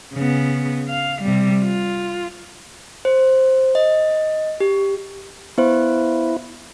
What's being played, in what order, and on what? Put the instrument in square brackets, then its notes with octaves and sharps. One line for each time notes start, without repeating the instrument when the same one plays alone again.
[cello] C#3 B3
F5
C3 G3
F4
[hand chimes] C5
D#5
G4
[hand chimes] B3 C5 [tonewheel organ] E4